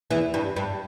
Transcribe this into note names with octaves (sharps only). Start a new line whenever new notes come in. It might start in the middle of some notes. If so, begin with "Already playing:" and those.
E2 E3
G2
G2